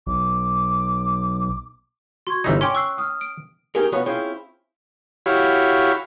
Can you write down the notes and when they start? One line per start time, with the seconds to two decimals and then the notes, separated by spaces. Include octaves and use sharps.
0.07 B1 D6
2.27 F#4 C6 C#6 G#6
2.44 G1 E3 D#4
2.61 C#4 G5 G#5 C6 D6
2.75 C#6 E6 F#6 C7
2.97 G5 D#6 F6
3.21 D7
3.75 C#4 D#4 G4 G#4 A#4
3.92 F3 B3 C#4 F#4 B4 C#5
4.06 C4 C#4 E4 F4 G#4 C5
5.26 E4 F#4 G4 C#5 F5 B5